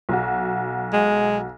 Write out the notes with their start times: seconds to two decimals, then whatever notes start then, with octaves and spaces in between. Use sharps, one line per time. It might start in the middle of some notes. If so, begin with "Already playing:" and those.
0.09 B1 F#4
0.93 G#3